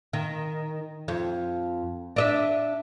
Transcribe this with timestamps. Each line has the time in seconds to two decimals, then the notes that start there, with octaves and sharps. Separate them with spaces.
0.13 D#3
1.08 F2
2.16 D4 D#5 E5